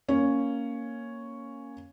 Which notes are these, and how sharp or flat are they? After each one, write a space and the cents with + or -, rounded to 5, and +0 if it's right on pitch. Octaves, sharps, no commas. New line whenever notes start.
A#3 +0 C#4 +0